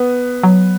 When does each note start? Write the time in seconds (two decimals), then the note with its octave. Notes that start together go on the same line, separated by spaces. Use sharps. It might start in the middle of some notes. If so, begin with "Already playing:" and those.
Already playing: B3
0.43 F#3